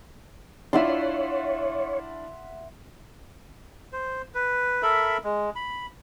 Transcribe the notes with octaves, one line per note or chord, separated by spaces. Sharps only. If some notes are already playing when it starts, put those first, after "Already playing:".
D4 E4 F4 C#5 E5 F#5 C6
C5
B4
A4 A#4 E5 B5
G#3
B5